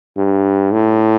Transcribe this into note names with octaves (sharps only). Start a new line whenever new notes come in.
G2
A2